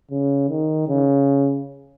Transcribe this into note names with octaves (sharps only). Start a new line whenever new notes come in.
C#3
D#3
C#3